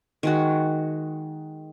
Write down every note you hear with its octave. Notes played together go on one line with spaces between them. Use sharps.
D#3 G#3 F#4